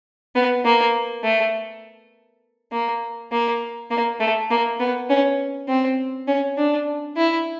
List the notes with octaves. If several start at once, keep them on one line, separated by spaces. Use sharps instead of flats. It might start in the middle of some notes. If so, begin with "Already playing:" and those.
B3
A#3
A3
A#3
A#3
A#3
A3
A#3
B3
C#4
C4
C#4
D4
E4